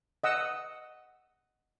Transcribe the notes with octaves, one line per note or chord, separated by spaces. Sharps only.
D#5 F#5 E6